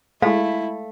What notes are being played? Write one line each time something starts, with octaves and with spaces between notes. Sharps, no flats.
G#3 A3 E4 F5